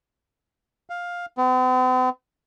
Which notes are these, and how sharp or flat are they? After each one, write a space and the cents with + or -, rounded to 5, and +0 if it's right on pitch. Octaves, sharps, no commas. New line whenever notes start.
F5 +10
C4 -45